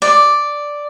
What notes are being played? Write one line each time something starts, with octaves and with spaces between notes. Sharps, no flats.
D5